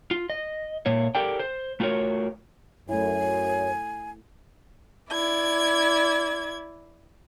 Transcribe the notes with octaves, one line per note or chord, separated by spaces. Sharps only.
F4
D#5
A#2 A#3 C#5
G4 A4 A#4 D5 G5
C5
A3 F4 F#4 A#4 C#5
F#2 A3 E4 C#5 G#5
E4 D5 G#6